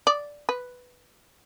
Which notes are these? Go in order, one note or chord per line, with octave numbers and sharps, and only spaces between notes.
D5
B4